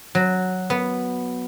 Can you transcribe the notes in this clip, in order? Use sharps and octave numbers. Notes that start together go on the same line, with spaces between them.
F#3
B3